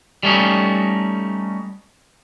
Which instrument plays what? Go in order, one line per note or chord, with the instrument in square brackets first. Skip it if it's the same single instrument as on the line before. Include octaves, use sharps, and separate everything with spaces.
[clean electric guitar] G3 A3 C#4 D#4